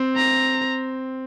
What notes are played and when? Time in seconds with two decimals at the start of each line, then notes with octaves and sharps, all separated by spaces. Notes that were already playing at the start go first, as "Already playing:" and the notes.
Already playing: C4
0.16 A#5